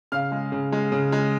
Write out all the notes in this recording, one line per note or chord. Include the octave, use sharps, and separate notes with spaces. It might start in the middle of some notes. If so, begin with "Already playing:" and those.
C#3 F5 F6
G#3
C#3
G#3
C#3
G#3